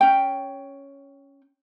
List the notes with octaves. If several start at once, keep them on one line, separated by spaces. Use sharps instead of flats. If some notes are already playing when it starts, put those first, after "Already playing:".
C#4 G5